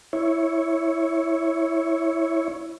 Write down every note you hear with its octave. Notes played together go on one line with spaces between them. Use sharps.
E4 C#5